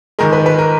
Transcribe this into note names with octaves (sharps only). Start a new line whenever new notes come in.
G#2 D#3 G#3 A#4
B4
B4
A#4